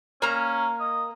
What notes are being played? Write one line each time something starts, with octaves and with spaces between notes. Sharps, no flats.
A#3 C#4 A#5
D#5